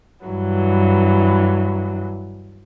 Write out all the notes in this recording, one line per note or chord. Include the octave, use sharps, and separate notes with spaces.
G2 E3 F#3